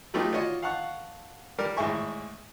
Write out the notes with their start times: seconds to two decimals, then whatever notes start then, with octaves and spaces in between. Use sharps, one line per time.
0.14 F#3 A3 B3 D#4 F4 G4
0.32 D4 F4 F#4 C#5 D#5
0.62 F5 F#5 A5 C#6 F#6
1.58 G3 D4 A#4
1.77 G#1 A2 G#3 E5 G#5 C#6